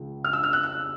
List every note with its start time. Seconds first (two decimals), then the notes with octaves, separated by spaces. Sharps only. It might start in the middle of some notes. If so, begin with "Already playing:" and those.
Already playing: C#2 C#3 F3
0.24 F6
0.33 E6
0.43 F6
0.53 F#6
0.63 F#6